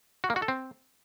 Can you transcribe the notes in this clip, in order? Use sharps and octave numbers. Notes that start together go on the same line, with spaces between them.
F#4
A#3
F#4
A4
C4